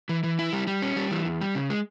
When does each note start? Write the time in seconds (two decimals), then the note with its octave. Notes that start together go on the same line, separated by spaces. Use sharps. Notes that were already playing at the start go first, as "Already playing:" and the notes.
0.09 E3
0.23 E3
0.39 E4
0.53 G3
0.67 G3
0.82 C#4
0.96 G3
1.11 E3
1.25 E2
1.41 G3
1.55 C#3
1.70 G#3